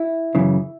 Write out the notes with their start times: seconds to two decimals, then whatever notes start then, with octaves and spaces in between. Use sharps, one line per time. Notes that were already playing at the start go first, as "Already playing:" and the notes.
Already playing: E4
0.35 F#2 C#3 E3